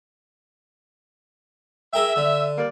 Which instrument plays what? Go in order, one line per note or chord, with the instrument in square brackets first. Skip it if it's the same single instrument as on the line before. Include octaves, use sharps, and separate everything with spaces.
[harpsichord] G#4 A#4 G5 [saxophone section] E5
[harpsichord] D3
[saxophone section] G3 A#3 D5